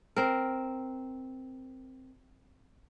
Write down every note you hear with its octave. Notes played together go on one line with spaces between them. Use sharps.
C4 A#4